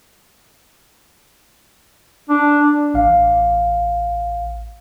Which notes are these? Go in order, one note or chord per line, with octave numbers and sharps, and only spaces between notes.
D4
A1 F5